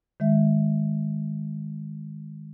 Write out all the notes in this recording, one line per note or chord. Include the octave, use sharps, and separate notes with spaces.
D#3 G#3 E5